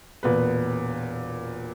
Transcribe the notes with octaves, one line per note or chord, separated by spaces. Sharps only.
E1 A#2 B3 B4